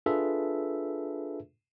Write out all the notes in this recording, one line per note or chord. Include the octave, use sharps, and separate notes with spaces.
D4 F4 G#4 A4 B4 E5